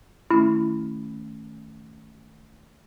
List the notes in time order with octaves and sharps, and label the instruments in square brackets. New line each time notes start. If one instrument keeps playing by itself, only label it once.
[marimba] D#3 A3 C#4 [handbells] E4